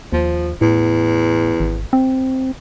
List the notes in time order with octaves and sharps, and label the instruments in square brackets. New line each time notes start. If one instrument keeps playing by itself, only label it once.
[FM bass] D#2 [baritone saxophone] F3
[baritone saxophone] E2 [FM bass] A2
[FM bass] G#1
C4